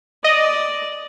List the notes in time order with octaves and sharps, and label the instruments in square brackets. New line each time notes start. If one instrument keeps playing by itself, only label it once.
[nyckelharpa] D5 [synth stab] D#5